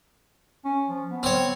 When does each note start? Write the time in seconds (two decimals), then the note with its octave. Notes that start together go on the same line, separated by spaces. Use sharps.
0.65 C#4
0.88 F3
1.10 B3
1.23 C4 C#5